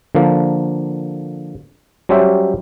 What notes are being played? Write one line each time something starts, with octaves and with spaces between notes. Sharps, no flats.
D3 F3 A#3
F#3 G3 C#4 G4 C5 E5